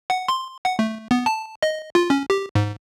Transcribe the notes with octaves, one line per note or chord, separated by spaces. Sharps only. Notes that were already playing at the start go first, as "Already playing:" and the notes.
F#5
C6
F#5
A3
B3
A5
D#5
F4
C#4
G4
G#2